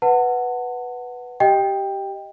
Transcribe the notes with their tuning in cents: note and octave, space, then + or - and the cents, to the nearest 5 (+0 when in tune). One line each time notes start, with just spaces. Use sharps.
B4 +0 F#5 +0 A5 +35
G4 -10 D#5 +5 G5 +10